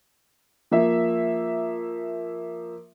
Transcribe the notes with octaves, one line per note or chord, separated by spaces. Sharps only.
F3 A#3 E5